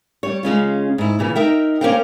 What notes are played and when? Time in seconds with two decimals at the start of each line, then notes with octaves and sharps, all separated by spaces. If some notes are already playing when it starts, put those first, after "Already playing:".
0.23 G3 C#5
0.43 C#3 G#3 C#4 F4
0.98 G#2 E4
1.19 A#2 C#3 E3 A#3
1.36 D#4 A#4 E5 G5
1.81 A#3 C#4 A#4 C5 F5 G5